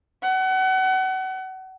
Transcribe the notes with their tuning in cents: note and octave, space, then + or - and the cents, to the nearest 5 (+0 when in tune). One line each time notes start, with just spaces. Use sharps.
F#5 +30